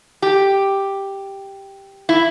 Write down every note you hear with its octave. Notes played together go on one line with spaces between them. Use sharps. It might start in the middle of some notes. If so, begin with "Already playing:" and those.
G4
E4